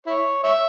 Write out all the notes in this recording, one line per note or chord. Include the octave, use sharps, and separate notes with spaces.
E4 C#5
C#5 E5